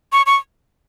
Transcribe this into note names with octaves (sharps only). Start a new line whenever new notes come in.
C#6
C#6